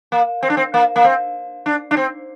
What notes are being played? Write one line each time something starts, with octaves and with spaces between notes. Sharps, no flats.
A#3
C4
D4
C4
A#3
A#3
C4
D4
D4
C4